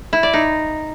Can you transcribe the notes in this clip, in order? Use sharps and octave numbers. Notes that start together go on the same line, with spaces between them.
E4
D5
D#4